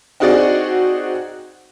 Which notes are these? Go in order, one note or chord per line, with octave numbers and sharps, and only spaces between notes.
C4 D#4 F#4 G#4 D5 F#5